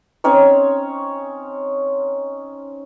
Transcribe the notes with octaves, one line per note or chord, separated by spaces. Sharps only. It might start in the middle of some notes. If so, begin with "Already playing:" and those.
C4 C#4 D#4 C#5